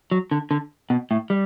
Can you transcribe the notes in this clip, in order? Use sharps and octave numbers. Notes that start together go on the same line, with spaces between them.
F#3
D3
D3
B2
A2
G3